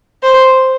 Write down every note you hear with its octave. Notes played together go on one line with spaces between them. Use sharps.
C5